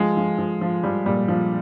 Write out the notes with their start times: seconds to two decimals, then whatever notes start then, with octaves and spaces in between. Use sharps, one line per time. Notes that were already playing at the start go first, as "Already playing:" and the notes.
Already playing: F3 G#3
0.17 F3
0.38 F3
0.61 F3
0.83 F3 G3
1.06 A#2 G3
1.28 F3